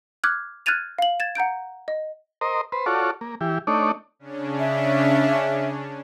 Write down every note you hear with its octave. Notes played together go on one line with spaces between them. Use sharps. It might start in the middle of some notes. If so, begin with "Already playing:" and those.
D6 F6 F#6 G#6
F6 F#6 G#6 A6 D#7 F7
F5 F#7
G#6 A6 E7
F#5 A#5 G6 D7
D#5
A#4 C5 D#5
B4 C5
F4 F#4 A4 C#5 D5
A#3
E3 G4
A3 D4 D#4 C#5 D5
C#3 C#4 D4
E5